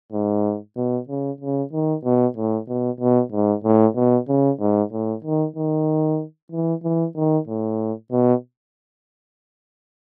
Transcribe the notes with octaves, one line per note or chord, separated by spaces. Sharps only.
G#2
B2
C#3
C#3
D#3
B2
A2
B2
B2
G#2
A2
B2
C#3
G#2
A2
D#3
D#3
E3
E3
D#3
A2
B2